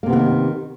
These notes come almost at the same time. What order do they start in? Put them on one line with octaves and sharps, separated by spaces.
A#3 C3 B3 E3 D#3